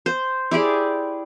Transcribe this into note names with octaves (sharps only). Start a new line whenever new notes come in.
C5
E4 G4 G#4 D5